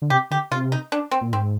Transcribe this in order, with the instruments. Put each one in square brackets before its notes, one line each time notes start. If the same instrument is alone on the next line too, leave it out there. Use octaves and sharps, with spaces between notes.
[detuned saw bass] D3
[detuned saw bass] C3 [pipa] G4
[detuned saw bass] D3 [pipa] G4
[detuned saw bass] C3 [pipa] F4
[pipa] D#4
D4
C4
[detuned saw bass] A#2
[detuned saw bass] G#2 [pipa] C4